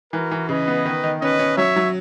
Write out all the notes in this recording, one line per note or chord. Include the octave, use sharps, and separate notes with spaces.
E3 F#4 A#4
E3
C#3 B4 D#5
B3
D#3
D#3
C#4 B4 D#5
C#4
F#3 C#5 E5
F#3